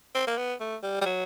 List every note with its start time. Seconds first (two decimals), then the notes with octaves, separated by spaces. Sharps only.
0.15 C4
0.27 A#3
0.38 B3
0.60 A3
0.83 G3
1.01 G3
1.05 F#3